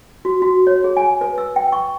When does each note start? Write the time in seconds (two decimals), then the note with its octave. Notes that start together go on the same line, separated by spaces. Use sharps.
0.25 F#4
0.42 F#4
0.67 C#5
0.84 G#4
0.97 G#5
1.21 B4
1.38 E6
1.56 G5
1.72 C#6